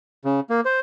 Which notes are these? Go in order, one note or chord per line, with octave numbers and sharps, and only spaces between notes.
C#3
A#3
C5